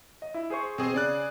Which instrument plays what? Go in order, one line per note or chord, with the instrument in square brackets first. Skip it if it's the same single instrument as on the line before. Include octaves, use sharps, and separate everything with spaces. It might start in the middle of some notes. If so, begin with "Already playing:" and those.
[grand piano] D#5
E4
G#4 C5 C#6
[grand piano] B2 [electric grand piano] C4 G#4 C5
[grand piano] C#3 [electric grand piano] G#4 D5 F#6